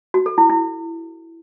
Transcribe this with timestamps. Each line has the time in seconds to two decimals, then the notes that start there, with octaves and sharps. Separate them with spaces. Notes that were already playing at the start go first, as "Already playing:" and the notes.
0.14 F#4
0.26 A4
0.38 E4
0.50 E4